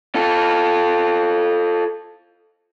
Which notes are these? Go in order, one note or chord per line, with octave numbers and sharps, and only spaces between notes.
F4 A4